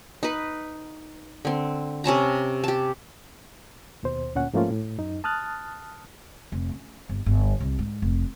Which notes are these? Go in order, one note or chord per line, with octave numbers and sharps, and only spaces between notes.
D#4 B4
D3 C4
C3 C#4 A5 A#5
G4 A5
D#2 B2 C5
D2 A#2 C#4 F#5
G#2 F3 A3 A#3 C#4 F4
A2
F#2 D#4
A5 D#6 F6 F#6 A6
F1
C#4
G1
G1
C2
G#2
F1